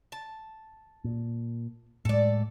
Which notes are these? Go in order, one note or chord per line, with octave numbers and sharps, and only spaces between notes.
A5
A#2
A2 G#3 A4 D5